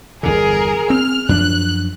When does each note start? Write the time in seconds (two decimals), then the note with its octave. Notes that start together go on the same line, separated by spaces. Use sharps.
0.23 G1 E2 D3 G#4 A#4
0.90 C4 F6
1.29 F#2 F3 D4 F#6